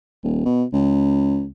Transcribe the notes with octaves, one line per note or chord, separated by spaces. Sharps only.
D#1
B2
C#2